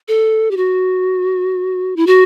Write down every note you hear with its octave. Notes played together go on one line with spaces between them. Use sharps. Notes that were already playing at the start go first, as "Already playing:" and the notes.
A4
G4
F#4
E4
F#4